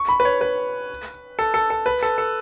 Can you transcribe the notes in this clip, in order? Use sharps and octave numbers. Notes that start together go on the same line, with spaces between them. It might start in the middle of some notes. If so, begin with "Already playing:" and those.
Already playing: C#6
B5
B4
C#5
B4
A4
A4
A4
B4
A4
A4